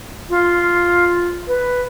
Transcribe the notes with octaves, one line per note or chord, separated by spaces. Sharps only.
F4
B4